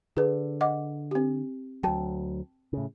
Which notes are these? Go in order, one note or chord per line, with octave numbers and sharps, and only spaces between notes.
D3 G#4 B4
D#5 F#5 D6
C4 G4
D2 F#3 G5 A5
A2 C#3